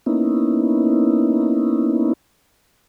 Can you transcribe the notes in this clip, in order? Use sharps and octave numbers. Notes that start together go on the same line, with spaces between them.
A#3 B3 C#4 D#4 E4